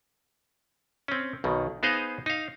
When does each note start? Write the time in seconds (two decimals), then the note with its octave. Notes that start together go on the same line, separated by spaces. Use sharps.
1.08 C4 C#4
1.44 B1 B2 D#3
1.83 B3 D#4 G#4 C5 D#5 F5
2.26 D#4 F5